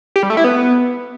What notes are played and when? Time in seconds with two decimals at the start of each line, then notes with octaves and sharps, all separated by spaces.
0.16 G4
0.23 G3
0.30 A3
0.37 E4
0.44 B3